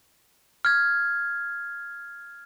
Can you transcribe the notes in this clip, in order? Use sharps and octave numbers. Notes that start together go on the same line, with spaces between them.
F6 G#6